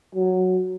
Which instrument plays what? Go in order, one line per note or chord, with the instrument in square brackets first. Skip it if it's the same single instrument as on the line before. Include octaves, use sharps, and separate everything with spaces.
[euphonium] F#3